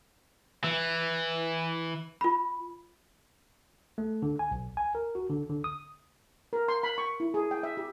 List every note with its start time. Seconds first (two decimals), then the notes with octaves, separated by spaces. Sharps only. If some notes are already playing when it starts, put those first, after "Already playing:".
0.64 E3
2.21 F4 B5
3.98 A3
4.22 D3
4.39 G#5
4.51 B1
4.77 G#5
4.95 A#4
5.15 F#4
5.30 D3
5.49 D3
5.64 D#6
6.53 A#4
6.68 C6
6.83 B5
6.98 C#6
7.20 E4
7.34 G#4
7.51 G5
7.63 E5
7.77 G4